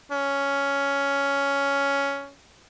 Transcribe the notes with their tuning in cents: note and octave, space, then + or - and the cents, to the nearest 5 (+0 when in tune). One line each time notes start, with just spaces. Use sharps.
C#4 +10